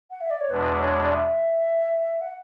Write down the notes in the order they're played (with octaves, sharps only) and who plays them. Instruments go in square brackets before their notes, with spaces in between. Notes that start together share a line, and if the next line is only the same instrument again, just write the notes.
[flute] F#5
E5
D5
C#5
[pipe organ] E2 B2 G#3 D4 [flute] B4
[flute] C#5
D5
E5
F#5